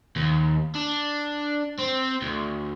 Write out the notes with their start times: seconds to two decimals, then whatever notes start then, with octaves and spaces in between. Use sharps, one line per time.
0.16 D#2
0.75 D4
1.78 C4
2.22 D2